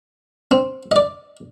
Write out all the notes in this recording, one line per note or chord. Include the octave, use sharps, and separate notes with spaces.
C4
D5 D#5